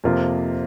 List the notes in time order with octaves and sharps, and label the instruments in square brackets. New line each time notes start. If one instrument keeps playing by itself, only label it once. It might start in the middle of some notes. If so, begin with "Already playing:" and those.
[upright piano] F2 C3 A#3 F4 A#4